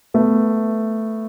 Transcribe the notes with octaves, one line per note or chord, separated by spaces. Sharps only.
A3 B3